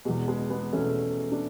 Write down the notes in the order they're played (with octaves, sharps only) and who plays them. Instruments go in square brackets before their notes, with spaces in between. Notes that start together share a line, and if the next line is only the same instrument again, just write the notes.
[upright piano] E2 B2 G#3
G#3 B3
G#3 B3
E2 B2 A3 C#4
D4